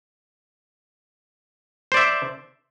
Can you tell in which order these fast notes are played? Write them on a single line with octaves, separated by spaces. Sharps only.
C5 D5 E5